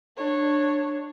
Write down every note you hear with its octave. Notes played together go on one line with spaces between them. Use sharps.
D4 C#5